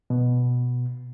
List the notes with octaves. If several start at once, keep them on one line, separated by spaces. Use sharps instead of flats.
B2